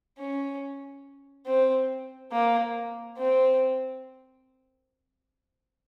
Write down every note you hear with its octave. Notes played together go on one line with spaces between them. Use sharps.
C#4
C4
A#3
C4